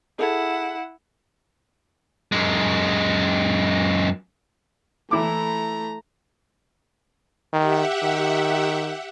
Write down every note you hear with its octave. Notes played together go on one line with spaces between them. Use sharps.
E4 G#4 A4 C#5 F#5
F#2 G#3
E3 A3 E4 A#5 D6
D#3 G4 E5 F#5
D#3